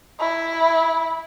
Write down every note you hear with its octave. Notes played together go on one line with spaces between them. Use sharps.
E4